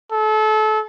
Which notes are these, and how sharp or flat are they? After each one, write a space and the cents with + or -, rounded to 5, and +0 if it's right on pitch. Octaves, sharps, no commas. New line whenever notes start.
A4 -30